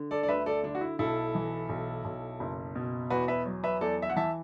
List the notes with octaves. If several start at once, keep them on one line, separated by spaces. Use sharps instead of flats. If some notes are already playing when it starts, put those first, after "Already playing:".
Already playing: D3
A4 D5
D5
D2 B4 E5
A4 D5
D3 D4
F#4
E4
B1 E4 A4
E3
B1
B1
F#1
B2
E2 F#4 B4
B4 E5
F#3
B4 E5
E2 A4 D5
E5
F#5
E3 E5 A5